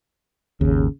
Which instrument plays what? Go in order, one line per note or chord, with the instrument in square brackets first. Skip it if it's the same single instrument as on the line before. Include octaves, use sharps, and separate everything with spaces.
[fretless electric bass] G#1 D#2 [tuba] C#3